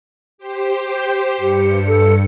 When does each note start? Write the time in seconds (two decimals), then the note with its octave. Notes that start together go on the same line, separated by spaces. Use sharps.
0.38 G4 C5
1.37 G2 G4 C#7
1.87 A4